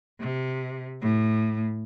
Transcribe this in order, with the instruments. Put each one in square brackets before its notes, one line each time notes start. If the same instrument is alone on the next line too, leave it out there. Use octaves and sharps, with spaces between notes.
[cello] C3
A2